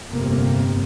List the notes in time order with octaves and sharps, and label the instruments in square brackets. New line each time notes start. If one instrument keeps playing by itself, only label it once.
[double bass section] G1 F2 C3 A#3